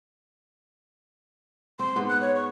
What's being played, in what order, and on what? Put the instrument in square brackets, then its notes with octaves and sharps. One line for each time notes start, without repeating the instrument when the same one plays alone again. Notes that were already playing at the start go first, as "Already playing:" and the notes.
[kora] C4 [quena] C6
[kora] G#2 B3
[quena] F#6
C#5
C#6